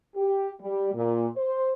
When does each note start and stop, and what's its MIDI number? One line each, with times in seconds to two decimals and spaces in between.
0.16 0.51 67
0.61 0.92 55
0.94 1.28 46
1.36 1.73 72